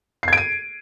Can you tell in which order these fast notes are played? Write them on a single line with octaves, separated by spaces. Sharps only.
C7 G#6 D7 D#7